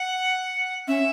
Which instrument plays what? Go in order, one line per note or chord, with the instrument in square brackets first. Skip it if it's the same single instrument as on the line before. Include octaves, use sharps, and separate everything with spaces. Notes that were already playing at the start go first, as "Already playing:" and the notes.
Already playing: [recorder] F#5
[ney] C#4 [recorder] E5